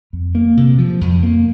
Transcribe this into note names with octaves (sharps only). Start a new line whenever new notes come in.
F2
A#3
C3
F3
F2
A#3